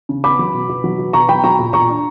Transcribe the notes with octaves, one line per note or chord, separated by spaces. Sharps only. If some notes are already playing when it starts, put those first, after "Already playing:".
C#3
B3 B5 D6
F#3
B2
B2
F#3
B2
B2 A#5 C#6
F#3 G5 B5
F#3 A#5 C#6
A#2
A#2 A#5 C#6
D4